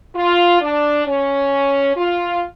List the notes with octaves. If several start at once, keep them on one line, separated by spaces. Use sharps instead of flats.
F4
D4
C#4
F4